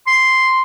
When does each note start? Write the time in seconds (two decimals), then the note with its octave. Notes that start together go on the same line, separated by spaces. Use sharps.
0.07 C6